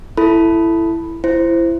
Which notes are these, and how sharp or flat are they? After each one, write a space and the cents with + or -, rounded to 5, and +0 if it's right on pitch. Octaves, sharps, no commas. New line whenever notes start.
E4 +10 A4 +0 B5 +0
E4 +25 C5 +0